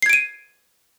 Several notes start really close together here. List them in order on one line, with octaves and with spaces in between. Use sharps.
C7 G#6 D7 D#7